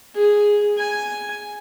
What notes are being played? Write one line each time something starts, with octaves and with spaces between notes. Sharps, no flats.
G#4
G#5